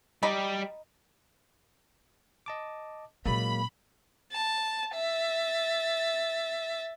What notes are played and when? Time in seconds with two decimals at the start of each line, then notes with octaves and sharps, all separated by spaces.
0.23 G3 D#4 D5 B5
2.46 D#5 A5 D6
3.26 A#2 F#3 G#3 A#3 C#4 B5
4.32 A5
4.95 E5 A6